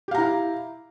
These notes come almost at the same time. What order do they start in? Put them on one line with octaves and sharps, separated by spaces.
G4 F5 A#5 E4